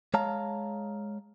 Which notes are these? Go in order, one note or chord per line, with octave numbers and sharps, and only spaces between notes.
G#3 C#5 F5 A5 A#5